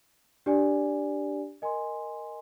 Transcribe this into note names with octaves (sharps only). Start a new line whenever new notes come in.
D4 G4 D5 G#5
A#4 D#5 G#5 C6